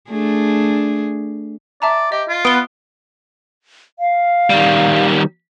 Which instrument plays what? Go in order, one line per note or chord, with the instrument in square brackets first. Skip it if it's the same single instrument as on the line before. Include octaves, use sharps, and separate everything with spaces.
[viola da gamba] A3 D4 G#4
[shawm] D5 [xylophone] E5 A5 A#5
[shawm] G4 [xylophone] D#5
[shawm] F4
[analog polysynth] B3 [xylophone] D7 G7
[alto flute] F5
[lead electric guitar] D#3 G3